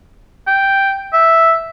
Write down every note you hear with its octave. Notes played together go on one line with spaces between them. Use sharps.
G5
E5